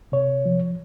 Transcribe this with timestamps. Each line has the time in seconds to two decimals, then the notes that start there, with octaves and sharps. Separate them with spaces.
0.12 C3 C#5
0.46 F3